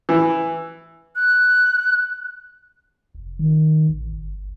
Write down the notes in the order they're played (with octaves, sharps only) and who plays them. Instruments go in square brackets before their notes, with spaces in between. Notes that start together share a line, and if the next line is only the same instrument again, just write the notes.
[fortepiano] E3
[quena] F#6
[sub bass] F1
D#3
A1
G1